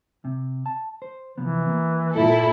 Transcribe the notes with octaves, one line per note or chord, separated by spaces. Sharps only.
C3
A5
C5
C3 E3 F3 B3
A#3
A#2 E4 A4